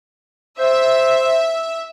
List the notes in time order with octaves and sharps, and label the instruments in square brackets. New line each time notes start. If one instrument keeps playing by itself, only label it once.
[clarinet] C5 [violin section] E5